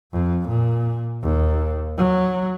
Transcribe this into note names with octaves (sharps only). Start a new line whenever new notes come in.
F2
A#2
D#2
F#3